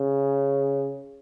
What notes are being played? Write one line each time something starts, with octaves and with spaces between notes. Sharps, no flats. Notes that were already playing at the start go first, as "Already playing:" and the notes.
Already playing: C#3